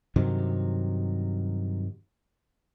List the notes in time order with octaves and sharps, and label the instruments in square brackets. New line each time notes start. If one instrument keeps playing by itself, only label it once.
[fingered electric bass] G2 C3 D#3 F#3